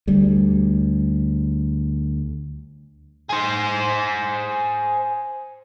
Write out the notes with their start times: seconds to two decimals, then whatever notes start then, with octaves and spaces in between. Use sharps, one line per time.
0.07 D2 G3
3.30 G#4 C5